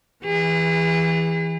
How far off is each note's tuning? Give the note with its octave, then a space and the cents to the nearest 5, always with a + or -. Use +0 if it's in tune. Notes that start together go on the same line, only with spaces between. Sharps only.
E3 +0 G#4 -35